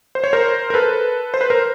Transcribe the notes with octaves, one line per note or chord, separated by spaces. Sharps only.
C5
C#5
A#4 C5
A#4
A4 B4
C5
B4
A#4 C5